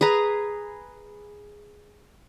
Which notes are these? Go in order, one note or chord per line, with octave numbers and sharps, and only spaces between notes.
G#4 B4 A#5